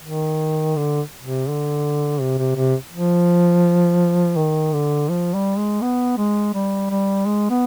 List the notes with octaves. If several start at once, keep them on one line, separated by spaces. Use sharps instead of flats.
D#3
D3
C3
D3
C3
C3
C3
F3
D#3
D3
F3
G3
G#3
B3
G#3
G3
G3
G#3
B3